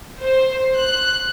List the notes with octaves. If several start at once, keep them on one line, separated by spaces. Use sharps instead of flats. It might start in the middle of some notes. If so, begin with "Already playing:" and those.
C5
F#6